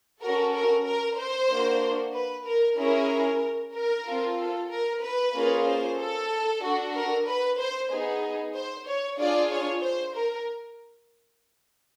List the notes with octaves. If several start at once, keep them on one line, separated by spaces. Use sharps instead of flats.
C#4 F#4 A4 A#4
A#4
A#4
C5
A#3 D4 F#4
B4
A#4
C#4 E4 G#4 A#4
A#4
C4 F4 A4
A4
A#4
B4
A#3 C#4 F4 G#4
C5
A4
D4 F#4 A4
A#4
B4
C5
B3 D#4 G#4
C5
C#5
D4 F4 G#4 D5
C#5
C5
A#4